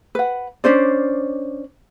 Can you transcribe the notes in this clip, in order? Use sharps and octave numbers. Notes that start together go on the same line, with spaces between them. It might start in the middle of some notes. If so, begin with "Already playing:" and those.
B4 F#5
C#4 D4 C5 D5